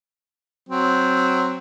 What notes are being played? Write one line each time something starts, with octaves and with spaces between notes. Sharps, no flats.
F#3 C4